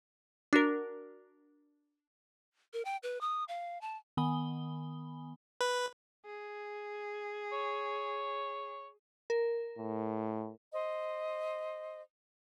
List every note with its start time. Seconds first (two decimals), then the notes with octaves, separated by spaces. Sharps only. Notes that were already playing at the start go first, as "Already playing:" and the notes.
0.53 D4 F#4 A#4
2.73 A#4
2.85 G5
3.03 B4
3.21 D#6
3.48 F5
3.81 A5
4.17 D#3 B3 G#5 B5 D#6 G7
5.61 B4
6.26 G#4
7.52 C#5
9.30 A#4
9.78 A2
10.72 C5 D#5